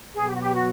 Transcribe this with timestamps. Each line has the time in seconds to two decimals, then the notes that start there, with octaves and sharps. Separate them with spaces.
0.14 B2 F#3 B3 G#4
0.28 G4
0.34 F#4
0.41 G4
0.55 F#4